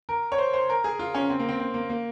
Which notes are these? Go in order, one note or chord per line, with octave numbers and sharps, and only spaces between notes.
A#4
C#5
C5
C5
A#4
G#4
F4
C#4
C4
A#3
C4
C4
A#3
A#3